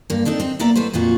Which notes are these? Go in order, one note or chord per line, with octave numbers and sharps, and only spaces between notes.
G2 A#3
C4 D4 D#4 A4
C4 D#4
A#3 B3 D5 E5 F5 A#5
G#2 A3 E4 B4 C5
F2 A#2 F4 F#4